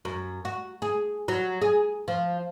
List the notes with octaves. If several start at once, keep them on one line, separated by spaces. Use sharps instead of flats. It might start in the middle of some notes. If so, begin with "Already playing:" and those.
F#2
F#4
G#4
F#3
G#4
F3